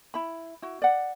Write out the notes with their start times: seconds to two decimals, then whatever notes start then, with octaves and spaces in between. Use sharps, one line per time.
0.14 E4 B5
0.62 E4 F#4
0.82 D5 F#5